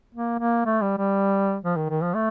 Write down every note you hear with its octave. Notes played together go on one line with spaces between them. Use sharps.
A#3
A#3
A3
G3
G3
F3
D#3
D#3
F3
A3